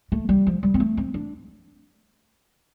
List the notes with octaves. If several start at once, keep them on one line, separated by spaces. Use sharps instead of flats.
A3
G3
F3
G3
C4
A3
C4
D4